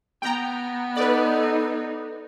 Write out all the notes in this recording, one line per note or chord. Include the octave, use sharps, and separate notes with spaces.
B3 G5 A#5
D#4 A4 B4 D5